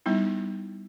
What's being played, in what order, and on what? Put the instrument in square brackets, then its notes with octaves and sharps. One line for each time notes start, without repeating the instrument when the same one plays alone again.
[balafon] G3 B3 D#4 E4